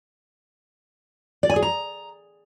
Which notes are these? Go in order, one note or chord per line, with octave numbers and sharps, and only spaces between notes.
D5
G#5
G#4
A#5